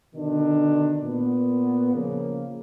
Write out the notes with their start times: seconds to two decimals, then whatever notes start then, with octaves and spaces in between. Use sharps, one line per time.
0.15 B2 D3 D#3 D4
1.02 A#2 B3
1.94 C#3 F3 A#3